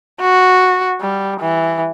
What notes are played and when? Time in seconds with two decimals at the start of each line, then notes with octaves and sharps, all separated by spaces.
0.21 F#4
1.01 G3
1.40 E3